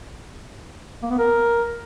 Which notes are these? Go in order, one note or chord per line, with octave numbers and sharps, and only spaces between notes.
A#3
B3
A#4